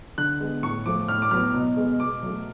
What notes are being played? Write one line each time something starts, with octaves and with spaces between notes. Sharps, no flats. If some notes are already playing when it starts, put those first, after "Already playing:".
D3 F#6
G#3 B3
A2 C#6
F3 A3 D6
A2 F6
D6
F#3 B3 F6
B2
G#3 B3
B2 D6
F#3 A3